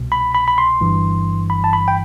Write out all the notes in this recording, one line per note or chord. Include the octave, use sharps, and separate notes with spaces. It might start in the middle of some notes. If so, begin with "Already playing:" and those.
Already playing: C2 B2
B5
B5
B5
C6
G1 G2 E3
B5
A5
B5
G5